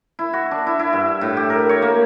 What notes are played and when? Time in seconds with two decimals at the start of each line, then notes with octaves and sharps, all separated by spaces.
0.19 E4
0.33 F#4
0.51 D4
0.67 E4
0.79 E4
0.93 G2
1.21 A2
1.37 G4
1.50 A#4
1.69 C#5
1.82 A#3